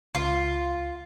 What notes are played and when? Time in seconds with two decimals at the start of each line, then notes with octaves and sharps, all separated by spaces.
0.15 C#2 F4